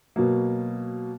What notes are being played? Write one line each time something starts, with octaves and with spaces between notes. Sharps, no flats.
B2 F#3 A#3